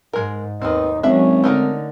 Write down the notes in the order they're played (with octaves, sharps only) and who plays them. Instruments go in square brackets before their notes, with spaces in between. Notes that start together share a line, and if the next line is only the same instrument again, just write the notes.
[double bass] G#2 [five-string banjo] G#3 A#4
[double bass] D#2 D#4 [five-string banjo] D#3 B3 C4
[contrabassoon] G#1 [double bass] F#3 C#4 [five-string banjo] D4 E5
[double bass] D3 [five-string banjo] A3 D#4 A#4